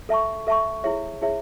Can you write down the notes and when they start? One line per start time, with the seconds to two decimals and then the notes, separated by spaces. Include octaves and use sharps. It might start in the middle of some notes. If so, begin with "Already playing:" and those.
0.09 A4 E5 A5 C#6
0.47 A4 E5 A5 C#6
0.84 E4 G#4 C#5 E5
1.22 E4 G#4 C#5 E5